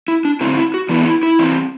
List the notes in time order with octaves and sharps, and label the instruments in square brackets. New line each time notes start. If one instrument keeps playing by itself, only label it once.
[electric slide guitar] E4
D4
D3 F#3 C4 E4
E4
F#4
E3 B3 D4 E4
E4
E4
E3 G3 C4